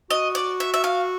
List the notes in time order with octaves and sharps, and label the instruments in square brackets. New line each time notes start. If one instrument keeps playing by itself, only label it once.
[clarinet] F#4 [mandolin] D#5
[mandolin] D5
E5
E5
F5